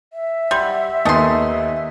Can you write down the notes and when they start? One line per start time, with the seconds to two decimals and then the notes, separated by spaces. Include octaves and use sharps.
0.13 E5
0.51 G3 F#5 C6
1.05 D#2 A3 B3 D#4 G#5 C6 D#6